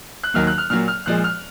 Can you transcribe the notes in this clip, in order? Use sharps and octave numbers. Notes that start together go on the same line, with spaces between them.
F#6
D#2 D#3 F#3 A#3 F6
F#6
F6
A#2 F#3 A#3 F6
F6
A#2 F3 G#3 F#6
F6